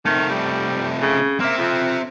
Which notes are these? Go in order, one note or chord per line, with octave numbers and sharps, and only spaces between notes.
C3 D#3 A3
G3
C#3
A#3 C4 E5
F2